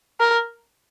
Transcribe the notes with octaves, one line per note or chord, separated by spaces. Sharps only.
A#4